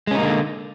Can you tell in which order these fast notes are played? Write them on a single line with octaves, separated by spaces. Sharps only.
G#3 C#4 D#4 A#3 D3